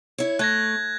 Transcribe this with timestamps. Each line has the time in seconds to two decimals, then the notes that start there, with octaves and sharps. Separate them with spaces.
0.18 E4 C#5
0.39 A3 F#6 G#6 A#6